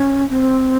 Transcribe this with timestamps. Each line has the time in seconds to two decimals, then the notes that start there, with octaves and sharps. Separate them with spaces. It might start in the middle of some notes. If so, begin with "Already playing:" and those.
Already playing: C#4
0.30 C4